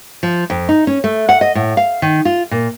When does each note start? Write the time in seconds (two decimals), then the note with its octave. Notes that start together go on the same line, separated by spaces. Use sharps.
0.23 F3
0.50 F2
0.69 D#4
0.87 C#4
1.04 A3
1.29 F#5
1.41 D#5
1.55 A2
1.77 F5
2.02 D#3
2.25 F4
2.51 A#2